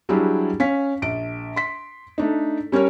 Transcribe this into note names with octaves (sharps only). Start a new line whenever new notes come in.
F#3 G3 D4 E4 G4 G#4
C#4 F5 B6
A#1 D7
C6 B6
A3 D4 D#4
G3 C#4 G4 A#4 C#5